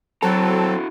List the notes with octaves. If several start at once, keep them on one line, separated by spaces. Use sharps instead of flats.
F#3 C4 E4 F#4 A4 A#5